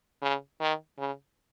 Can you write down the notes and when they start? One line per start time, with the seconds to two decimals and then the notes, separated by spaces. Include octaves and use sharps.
0.22 C#3
0.60 D#3
0.98 C#3